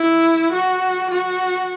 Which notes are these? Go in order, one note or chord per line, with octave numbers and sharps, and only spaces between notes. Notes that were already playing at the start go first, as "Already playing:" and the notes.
Already playing: E4
F#4
F#4